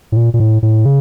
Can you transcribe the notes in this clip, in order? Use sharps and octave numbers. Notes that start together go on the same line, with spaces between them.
A2
A#2
A#2
A2
A2
C#3